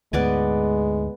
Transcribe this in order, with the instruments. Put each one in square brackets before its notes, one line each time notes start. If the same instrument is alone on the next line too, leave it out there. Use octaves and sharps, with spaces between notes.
[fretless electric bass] D2 G#2 [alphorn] G#3 [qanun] B3 D5 G#5